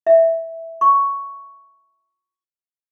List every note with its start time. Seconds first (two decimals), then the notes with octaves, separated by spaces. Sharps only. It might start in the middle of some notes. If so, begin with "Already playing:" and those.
0.07 E5
0.81 C#6